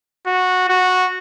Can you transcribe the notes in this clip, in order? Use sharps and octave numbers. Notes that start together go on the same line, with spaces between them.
F#4
F#4